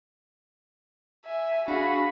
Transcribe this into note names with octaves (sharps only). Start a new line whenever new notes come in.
E5 G#5
D4 F#4 G#4 F5 B5